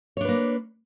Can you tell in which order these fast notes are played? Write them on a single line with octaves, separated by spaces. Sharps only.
C#5 D4 B4 A#3